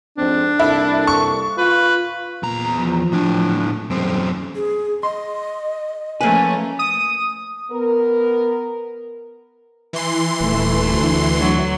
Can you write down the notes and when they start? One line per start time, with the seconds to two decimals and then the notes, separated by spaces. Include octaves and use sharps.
0.18 F2 G#2 C4 D4
0.59 C2 A#3 E4 A4
1.07 C#6
1.58 F4 B4
2.43 E2 A#2 A#5
2.80 F3
3.12 A2 D4
3.56 A3
3.90 D#1 F#2 C4
4.55 G#4
5.03 D#5 C6
6.21 F3 A3 A#3 C#4 B4 G#5
6.79 D#6
7.72 B3 A#4
9.93 E3 C6
10.41 D#1 A3
10.94 D2
11.40 F#3